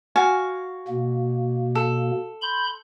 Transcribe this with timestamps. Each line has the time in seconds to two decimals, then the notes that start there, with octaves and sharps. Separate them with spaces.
0.16 F#4 F5 G#5
0.88 B2 A#3
1.75 A4
2.42 B5 C6 G6